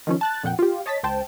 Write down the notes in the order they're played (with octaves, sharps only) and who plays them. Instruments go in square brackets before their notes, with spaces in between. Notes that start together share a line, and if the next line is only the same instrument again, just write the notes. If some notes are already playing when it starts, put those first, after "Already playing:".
[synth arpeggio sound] D#3 F3 C#4
A5 F#6 A6
F2 A#2 F#5 G5
F4 G4
C#5 D#5 A5 A6 B6
C#2 C5 G5 A5